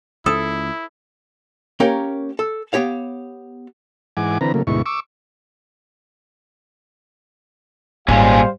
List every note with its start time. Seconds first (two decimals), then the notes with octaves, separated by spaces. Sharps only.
0.26 C#2 E4 A4 C5 D#6
1.80 A#3 C#4 G4 A#4 C#5 G5
2.39 A4
2.73 B3 G4 C#5 F5
4.17 G#2 E3 F#5 G#5 D6
4.41 D3 E3 C4 B4 A#5
4.54 C#3 F#3 A3 A#3
4.67 D2 G#2 B2 E4 C#6
4.86 C#6 D6 E6
8.08 G#1 A#2 G3 G#3 C#4 C5 F5